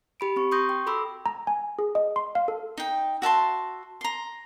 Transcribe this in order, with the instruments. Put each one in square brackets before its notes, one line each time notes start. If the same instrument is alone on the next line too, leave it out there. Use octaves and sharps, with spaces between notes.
[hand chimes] G4 B5 D7
C4 C#6
C6 C#6 D#6 G6 A#6
G5
F#4 A4 B5 C6 D6 E6
[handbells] A#5
G#5
G#4
D#5
C6
F5
A4
[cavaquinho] D#4 G5
F#4 E5 A5 C6
A#5 C6